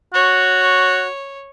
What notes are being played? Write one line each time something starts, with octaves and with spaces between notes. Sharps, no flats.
F#4 C#5